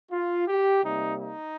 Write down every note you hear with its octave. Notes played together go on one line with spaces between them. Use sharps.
F4
G4
C3 G3 A#3 D#4
D#4